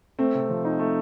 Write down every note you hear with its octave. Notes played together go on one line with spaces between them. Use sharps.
A3 C4
C3
F3
D#4
A3